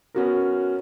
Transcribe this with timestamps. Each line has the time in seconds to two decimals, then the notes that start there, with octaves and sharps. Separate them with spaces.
0.15 B3 C#4 F#4 A#4